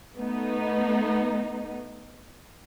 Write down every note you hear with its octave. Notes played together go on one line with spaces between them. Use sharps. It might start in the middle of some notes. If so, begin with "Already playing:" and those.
A3 B3 D#4